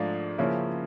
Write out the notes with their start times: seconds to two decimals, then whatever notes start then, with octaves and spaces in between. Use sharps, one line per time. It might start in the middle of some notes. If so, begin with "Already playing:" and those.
Already playing: G#2 F3 A3 D4 F5
0.38 C#3 F3 A#3 C#4 E4